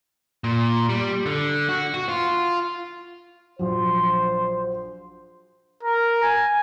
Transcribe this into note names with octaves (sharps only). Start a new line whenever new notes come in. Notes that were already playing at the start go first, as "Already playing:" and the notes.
A#2
G3
D3
F#4
F#4
F4
A#1 F#3 C5
A#4
G#5